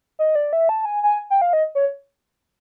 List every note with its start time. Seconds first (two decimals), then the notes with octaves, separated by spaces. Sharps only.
0.19 D#5
0.35 D5
0.53 E5
0.69 A5
0.85 G#5
1.03 G#5
1.30 G5
1.41 F5
1.53 D#5
1.75 C#5